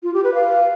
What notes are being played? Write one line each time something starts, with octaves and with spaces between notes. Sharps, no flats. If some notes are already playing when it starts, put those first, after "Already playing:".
F4
G4
B4
F5